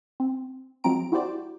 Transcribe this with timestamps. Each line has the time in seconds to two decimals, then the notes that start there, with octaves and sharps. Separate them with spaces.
0.20 C4
0.84 F3 F#3 G#3 C4 A#5 D7
1.12 E4 F#4 G4 C5 D5